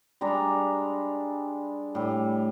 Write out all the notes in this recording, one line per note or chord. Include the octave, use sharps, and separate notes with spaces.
G3 G#3 D4 A#5
A2 G3